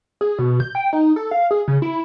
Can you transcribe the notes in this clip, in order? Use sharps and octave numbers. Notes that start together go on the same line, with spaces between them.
G#4
B2
G6
G5
D#4
A4
F5
G#4
C#3
E4